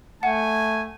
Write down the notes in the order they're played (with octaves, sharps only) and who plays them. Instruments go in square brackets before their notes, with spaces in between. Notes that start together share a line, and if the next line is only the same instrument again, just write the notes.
[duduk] A3 [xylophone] F#5 [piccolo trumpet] G#5